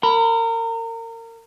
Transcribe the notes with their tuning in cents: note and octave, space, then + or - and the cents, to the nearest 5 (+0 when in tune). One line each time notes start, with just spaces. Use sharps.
A#4 -30 B5 +0